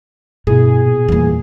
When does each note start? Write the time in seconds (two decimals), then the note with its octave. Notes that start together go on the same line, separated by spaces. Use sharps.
0.47 G2 B2 E4 G#4
0.86 A#2
1.08 E2 A#2 E3 G3 A#3